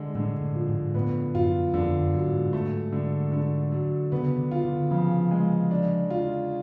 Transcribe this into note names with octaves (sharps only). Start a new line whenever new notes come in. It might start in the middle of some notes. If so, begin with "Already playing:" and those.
Already playing: D3 G#3
A2 D3
A2
F3
G#2
A2 B3
F#2 F4
F2 D3
F#2
F#3
G#2
G#2 A3
D3
D3
F#3
C#3 B3
D3
F4
D3
C#3 F3
G#3
D4
F4